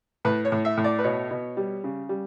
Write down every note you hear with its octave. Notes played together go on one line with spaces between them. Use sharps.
A2 B4
C#5
A2
E5
A2
D5
B4
B2 C#5
B2
G3
C#3
G3